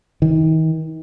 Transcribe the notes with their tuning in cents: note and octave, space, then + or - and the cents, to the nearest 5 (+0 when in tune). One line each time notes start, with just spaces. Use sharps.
D#3 +40